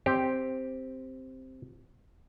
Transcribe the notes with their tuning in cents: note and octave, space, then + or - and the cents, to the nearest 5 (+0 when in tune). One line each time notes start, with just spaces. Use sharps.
C4 +0 G4 +0